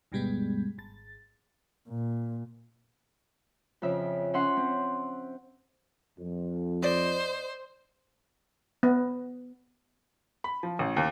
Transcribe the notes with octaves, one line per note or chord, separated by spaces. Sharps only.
D2 G2 B2 G3 G#3 B3
G#1 A6
A#2
F2 C#3 E5
C#4 E5 F#5 C6
C4
F2
C5 D5 D#5
B3
B5
F3
A1
D#2